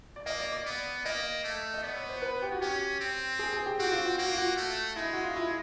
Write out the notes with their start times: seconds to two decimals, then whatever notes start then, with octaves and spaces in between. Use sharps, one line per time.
0.16 D5
0.26 A#3 D#5
0.40 D5
0.52 D5
0.66 B3
1.05 A#3 D#5
1.44 A3
1.74 D#5
1.83 B3 D5
1.96 C#5
2.09 C5
2.22 B4
2.42 G4
2.51 F#4
2.61 C#4 G4
3.00 C4
3.39 G#4
3.53 G#4
3.66 G4
3.79 C4 F#4
3.92 F4
4.05 F#4
4.18 A#3 F#4
4.28 F4
4.38 F#4
4.57 A3
4.96 G#3 E4
5.13 F#4
5.24 F4
5.36 E4